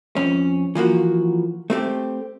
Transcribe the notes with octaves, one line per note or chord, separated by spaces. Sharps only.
F2 C#4
E3 F3 A#3 F#4
A3 C4 G4